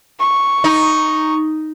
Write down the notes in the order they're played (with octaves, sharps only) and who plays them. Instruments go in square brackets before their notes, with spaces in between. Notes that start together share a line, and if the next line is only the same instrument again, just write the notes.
[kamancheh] C#6
[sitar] D#4